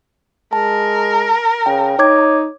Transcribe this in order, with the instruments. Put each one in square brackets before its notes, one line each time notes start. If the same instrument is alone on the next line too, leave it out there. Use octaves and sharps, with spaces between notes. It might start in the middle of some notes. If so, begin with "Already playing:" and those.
[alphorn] G#3 [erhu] A#4 [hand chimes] A5
[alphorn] C#3 [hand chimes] G5
[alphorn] D#4 [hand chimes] C#5 D6 G#6